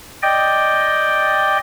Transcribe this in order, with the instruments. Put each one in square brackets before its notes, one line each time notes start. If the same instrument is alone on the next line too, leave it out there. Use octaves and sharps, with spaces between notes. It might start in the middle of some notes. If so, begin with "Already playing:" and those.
[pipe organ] D5 D#5 G5